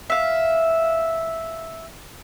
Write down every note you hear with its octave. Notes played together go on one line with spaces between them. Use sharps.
E5 F5